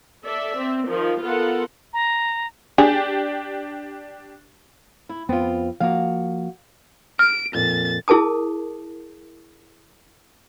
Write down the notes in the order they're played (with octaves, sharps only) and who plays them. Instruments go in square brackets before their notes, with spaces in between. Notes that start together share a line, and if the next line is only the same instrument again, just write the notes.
[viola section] A4 D5 E5
C4
D#3 F3
B3 F4 A4 A#4 F#5
[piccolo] A#5
[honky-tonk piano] D4 G4 [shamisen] G#4
[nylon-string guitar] E4
[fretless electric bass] F2 B3 [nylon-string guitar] C4 F4
[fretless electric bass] F3 A#3 [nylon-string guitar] F#4 F5
[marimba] F6 [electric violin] D7
[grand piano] F2 A#2 [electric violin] A6
[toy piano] E4 G#4 A#4 A5 D#6